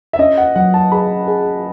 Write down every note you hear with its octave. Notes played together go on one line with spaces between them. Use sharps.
E5
C#4 D#5
F#5
F#3 F#5
A5
G#4 B5
G#4